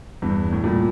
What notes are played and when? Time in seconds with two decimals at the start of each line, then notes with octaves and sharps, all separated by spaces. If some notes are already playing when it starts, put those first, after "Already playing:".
0.22 E2 G2
0.52 A2
0.64 G2 A#2